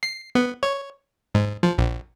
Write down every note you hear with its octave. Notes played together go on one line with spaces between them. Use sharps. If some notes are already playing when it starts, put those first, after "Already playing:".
C7
B3
C#5
G#2
F3
A#1